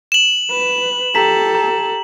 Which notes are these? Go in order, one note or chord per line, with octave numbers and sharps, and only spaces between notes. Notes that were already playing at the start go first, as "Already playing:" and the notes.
E7 F#7
B4
G4 A4 A#5 B6
A#5